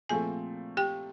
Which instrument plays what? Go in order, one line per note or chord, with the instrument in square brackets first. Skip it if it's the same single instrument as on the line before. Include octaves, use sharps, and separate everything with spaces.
[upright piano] A#2 F3 A3 C4 [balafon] G#4 G#5
[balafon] G4 G5